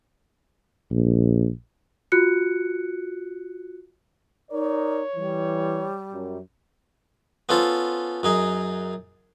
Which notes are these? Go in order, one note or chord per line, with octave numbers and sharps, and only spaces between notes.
A#1
F4 F#4 F#6 C#7
D#4 A#4 C#5 D5
E3 G3
F#2
B3 C#4 F4 A4 C5
F#2 D#4 G#4